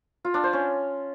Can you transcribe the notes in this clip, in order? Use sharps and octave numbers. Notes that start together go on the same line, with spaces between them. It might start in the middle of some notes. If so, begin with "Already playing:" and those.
F4
D4
C5
C#4